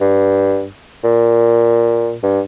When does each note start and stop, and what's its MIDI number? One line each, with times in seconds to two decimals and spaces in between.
0.01 0.65 43
1.04 2.14 46
2.23 2.41 43